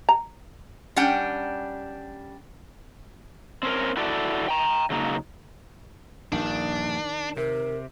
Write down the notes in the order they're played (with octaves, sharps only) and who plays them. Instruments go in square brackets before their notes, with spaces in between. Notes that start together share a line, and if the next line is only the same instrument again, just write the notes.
[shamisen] A#5
[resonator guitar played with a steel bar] G3 C#4 D4 F#5 G5
[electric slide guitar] C4 C#4 A#4
E4 F#4 A4 D5
G5 A#5
C#3 F#3 A#3 D#4
[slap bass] A#1 G2 [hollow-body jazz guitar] D#3 [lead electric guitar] D4
[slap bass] C3 [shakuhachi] A#4